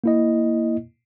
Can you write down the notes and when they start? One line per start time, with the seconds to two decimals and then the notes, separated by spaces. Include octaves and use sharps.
0.04 A#3 E4 D#5